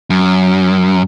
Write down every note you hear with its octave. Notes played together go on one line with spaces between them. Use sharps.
F#2